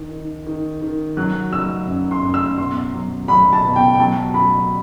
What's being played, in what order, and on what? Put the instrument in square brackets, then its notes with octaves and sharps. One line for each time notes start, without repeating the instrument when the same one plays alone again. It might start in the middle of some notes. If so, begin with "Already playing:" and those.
Already playing: [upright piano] D#3
D#3
D#3
D#3
[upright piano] F#3 [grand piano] F#6
[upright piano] F#3 [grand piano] E6
[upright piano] F#2
[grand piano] C6
[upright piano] F#2
[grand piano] E6
[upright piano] B2 [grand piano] C6
[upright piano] F#3
[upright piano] F#3 [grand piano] B5
[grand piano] A5
[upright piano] B2
[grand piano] G5
G5
[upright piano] F#3 [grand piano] A5
[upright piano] F#3 [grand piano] B5